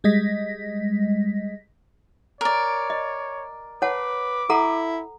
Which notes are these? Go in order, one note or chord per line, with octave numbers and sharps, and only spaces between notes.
G3 G#3 D#5 A#6 B6
A#4 C#5 D5
D#5
B4 C#5 F#5 A5 D6
E4 A4 F#5 A#5